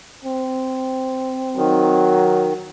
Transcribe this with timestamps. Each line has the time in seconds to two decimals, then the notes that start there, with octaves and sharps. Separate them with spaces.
0.25 C4
1.56 D#3 F#3